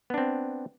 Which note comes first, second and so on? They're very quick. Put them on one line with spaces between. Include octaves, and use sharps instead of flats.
B3 D4 C4